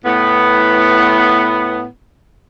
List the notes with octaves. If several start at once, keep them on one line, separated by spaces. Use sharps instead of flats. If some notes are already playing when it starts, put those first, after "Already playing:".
A2 B3